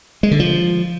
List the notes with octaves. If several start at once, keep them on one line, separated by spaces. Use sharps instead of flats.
G#3
D3
F3